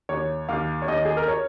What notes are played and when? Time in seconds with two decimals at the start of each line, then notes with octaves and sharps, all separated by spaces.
0.09 D#2 C#5
0.49 D#2 F5
0.82 C#5
0.88 D#2 D#5
1.05 G#4
1.17 A#4
1.28 C#5